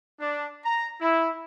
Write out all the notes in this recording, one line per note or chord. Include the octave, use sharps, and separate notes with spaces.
D4
A#5
E4